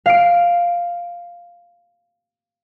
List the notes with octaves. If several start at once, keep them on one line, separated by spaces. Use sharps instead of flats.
F5 C7 D7